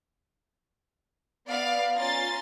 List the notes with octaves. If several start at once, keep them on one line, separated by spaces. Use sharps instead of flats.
B3 D5 F5
C#4 F4 A#5 C6 A6